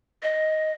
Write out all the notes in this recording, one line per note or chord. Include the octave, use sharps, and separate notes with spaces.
D#5